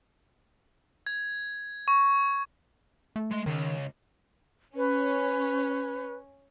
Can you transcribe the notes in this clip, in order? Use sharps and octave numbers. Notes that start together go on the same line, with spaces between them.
G#6
C#6
A3
G#3 C6
C#2 D#3
C#4 B4